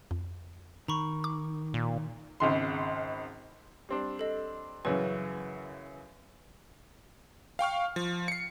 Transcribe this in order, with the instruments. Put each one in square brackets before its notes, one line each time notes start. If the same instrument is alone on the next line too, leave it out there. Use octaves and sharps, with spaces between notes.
[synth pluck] F2
[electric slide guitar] D#3 [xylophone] A#5 B5 C#6
[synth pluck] D6
[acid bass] A#2
[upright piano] G#1 C#2 C6
[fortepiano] G3 C4 D4
[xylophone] A4 D#5
[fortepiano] F#2 C#3 E3 [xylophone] B4
[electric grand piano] F5 G5 C#6 F6
F3
C7 C#7